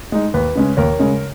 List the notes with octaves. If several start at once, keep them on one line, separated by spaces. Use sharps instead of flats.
G#3 D#4
D#2 B4
C#3 G#3 C#4
D#2 A#4 C#5
C#3 G#3 C#4